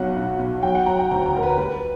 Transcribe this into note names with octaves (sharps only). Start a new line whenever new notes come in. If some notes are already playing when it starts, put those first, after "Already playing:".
Already playing: B1 F#3 F#5
B1
B1
F#3 G5
F#5
F#3 A#5
G5
D2 A#5
A#5
D2 A#4
B4
G3 B4